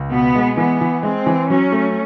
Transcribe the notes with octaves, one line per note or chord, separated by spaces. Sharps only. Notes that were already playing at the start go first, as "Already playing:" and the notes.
Already playing: C#2
B2 B3
G#3
E3 B3
E3
G#3 C4
E3
F#3 C#4
A3